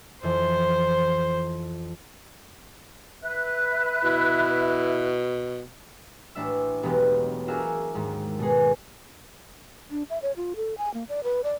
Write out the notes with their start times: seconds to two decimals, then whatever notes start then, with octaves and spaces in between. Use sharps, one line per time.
0.23 F2 E3 C5
3.22 B4 E5 F#6
4.04 B2 E4
6.35 A1 D4 E5 E6
6.83 E1 B1 B3 G4 D#5
7.48 D4 F#4 G#4 A#4 E5 F5
7.94 D#2 G#2
8.39 B2 G#3 D#4 G#4
9.91 D4
10.10 E5
10.22 C#5
10.37 F4
10.56 A4
10.78 G#5
10.94 A#3
11.09 D5
11.24 B4
11.44 D5